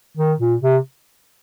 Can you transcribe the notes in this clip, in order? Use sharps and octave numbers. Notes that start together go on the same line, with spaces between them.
D#3
A#2
C3